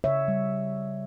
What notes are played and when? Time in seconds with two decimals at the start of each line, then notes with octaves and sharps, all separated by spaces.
0.04 C#3 C#5 E5
0.28 G3